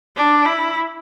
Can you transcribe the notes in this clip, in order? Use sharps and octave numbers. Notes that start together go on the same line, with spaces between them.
D4
E4